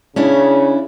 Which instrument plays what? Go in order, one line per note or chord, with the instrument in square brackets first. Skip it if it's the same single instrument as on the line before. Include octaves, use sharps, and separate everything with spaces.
[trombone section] C#3 [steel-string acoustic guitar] C#4 D4 E4